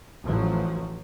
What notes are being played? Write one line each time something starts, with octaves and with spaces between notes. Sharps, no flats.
A1 F3 F#3